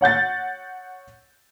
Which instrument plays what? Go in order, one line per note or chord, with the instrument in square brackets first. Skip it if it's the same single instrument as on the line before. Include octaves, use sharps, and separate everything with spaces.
[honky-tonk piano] C#5 F#5 G6 A6